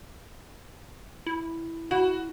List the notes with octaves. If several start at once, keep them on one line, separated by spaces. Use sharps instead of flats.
E4
E4 F#4